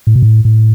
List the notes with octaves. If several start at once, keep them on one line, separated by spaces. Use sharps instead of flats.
A2
B2
A2
A2